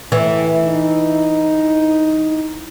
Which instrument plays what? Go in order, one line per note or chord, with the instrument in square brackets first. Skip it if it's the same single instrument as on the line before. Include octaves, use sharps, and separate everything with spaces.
[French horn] A2 [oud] E3
[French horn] D#4